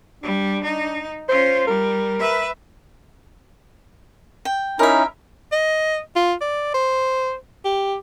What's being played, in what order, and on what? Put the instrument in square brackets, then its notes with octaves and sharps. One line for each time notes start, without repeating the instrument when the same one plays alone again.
[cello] G3 [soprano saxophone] D4
[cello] D#4
[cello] C#4 F4 [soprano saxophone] C5
[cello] G3 [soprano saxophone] A#4
[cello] B4 E5
[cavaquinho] G5
[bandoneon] C#4 D#4 E4 [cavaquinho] A#4 E5
[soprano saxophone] D#5
F4
D5
C5
G4